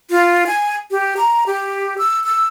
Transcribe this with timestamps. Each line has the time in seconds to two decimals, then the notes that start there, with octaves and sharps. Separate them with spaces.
0.11 F4
0.47 G#5
0.91 G4
1.17 A#5
1.47 G4
1.98 E6
2.24 E6